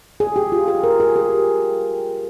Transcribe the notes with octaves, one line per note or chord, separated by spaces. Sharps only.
G#4
G4
F4
G#4
A#4
G#4
G4